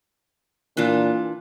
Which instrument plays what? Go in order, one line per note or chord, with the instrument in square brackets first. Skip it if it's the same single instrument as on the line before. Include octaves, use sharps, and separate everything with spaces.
[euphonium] A#2 [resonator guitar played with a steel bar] E3 D4 F4